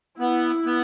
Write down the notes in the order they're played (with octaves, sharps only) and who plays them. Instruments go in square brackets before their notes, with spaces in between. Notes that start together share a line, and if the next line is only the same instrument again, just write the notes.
[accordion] B3 [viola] E4
[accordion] B3